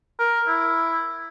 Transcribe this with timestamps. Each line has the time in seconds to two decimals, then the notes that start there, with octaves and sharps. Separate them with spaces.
0.19 A#4
0.47 E4